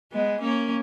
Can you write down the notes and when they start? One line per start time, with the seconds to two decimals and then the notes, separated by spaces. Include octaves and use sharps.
0.12 G#3 B3
0.41 A#3 C#4